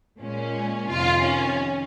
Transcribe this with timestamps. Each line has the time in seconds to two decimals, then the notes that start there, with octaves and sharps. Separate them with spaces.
0.21 A#2 G#3 C#4
0.89 F2 C3 D#3 F4
1.22 C#4